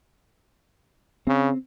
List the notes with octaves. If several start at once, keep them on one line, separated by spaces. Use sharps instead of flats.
C#3 C4